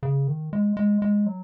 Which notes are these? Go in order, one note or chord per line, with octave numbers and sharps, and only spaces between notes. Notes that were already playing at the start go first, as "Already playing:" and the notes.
C#3
D#3
G#3
G#3
G#3
F#3